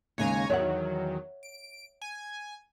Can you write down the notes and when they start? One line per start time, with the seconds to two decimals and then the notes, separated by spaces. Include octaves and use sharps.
0.18 D#2 C#3 G#3 C#5 G#5 A#5
0.50 E2 D#3 F#3 C#5 E5 F#5
1.43 D7
2.02 G#5